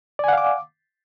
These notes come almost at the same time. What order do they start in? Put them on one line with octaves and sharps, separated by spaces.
D5 G#5 F#5 F5 D6